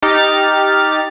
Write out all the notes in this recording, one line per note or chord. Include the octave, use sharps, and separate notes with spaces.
D#4 G4 F6 A6